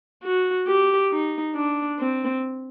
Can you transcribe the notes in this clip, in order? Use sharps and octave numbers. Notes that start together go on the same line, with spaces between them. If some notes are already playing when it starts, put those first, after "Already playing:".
F#4
G4
D#4
D4
C4